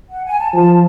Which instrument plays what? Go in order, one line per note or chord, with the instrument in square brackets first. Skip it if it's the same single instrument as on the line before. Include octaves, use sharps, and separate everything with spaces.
[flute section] F#5
G#5
A5
[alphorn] F3 [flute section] A5